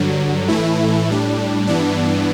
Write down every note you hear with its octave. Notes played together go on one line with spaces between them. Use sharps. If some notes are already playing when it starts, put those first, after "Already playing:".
Already playing: G2 D3 F#3
A2 E3 A3 E4
A2 G3 D4
G2 E3 B3 D4